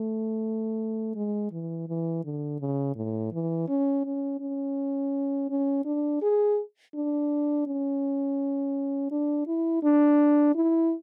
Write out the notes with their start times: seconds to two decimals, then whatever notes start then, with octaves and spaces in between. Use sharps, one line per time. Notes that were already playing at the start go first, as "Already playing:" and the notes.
Already playing: A3
1.15 G#3
1.52 E3
1.88 E3
2.24 D3
2.60 C#3
2.95 A2
3.32 E3
3.68 C#4
4.05 C#4
4.40 C#4
5.50 C#4
5.85 D4
6.22 G#4
6.94 D4
7.67 C#4
9.11 D4
9.47 E4
9.83 D4
10.55 E4